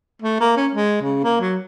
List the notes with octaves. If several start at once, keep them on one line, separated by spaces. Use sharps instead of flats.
A3
A#3
C#4
G#3
C#3
A#3
F#3